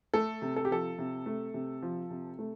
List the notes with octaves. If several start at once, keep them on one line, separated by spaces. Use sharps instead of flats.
A3 A4
C3
A4
G4
F3 A4
C3
A3
C3
F3
C3
A3